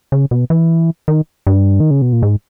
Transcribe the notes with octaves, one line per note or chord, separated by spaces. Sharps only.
C#3
B2
E3
D#3
G2
D#3
C#3
B2
A#2
G#2